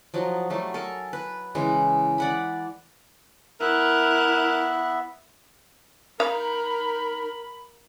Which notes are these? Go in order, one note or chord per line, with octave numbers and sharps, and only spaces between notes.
F3 F#3 D#4 F#4
F#3 G3 A3
A4 A#4 G#5
B4
C#3 E3 G#3
D5 F#5 B5
B3 E4 A#4 E5 F#6
D#4 A#4 F5 B5